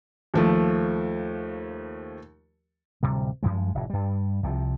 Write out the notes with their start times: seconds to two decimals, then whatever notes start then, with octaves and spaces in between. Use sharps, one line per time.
0.34 D#2 F3 A3
3.03 D1 C3 G3
3.43 F#2 F3 G#3
3.75 F1 A2
3.90 G2 G3
4.43 C2 C3 F3